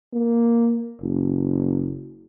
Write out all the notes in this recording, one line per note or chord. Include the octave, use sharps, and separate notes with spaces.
A#3
F#1